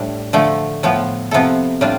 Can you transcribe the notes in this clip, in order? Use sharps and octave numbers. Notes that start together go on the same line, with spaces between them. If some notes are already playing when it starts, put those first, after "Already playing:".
Already playing: A2 G3 D4
D3 F3 A3
A2 F3 B3
C3 F3 B3 E4 A4
A2 G3 D4 F4